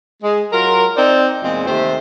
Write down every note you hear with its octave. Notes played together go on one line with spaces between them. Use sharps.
G#3
F#3 F4 A#4
C4 D#4 C5 D5
E2 A#2 G#3 C4 F4
D#2 C3 A3 C5